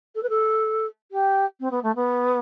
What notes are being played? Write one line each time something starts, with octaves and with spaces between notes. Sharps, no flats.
A4
B4
A4
G4
C4
B3
A3
B3